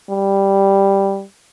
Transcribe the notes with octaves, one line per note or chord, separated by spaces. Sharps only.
G3